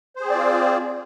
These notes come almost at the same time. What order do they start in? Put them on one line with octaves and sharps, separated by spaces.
C5 G#4 C4 D5 F4